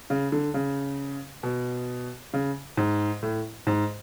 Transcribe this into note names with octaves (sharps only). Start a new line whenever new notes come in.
C#3
D3
C#3
B2
C#3
G#2
A2
G#2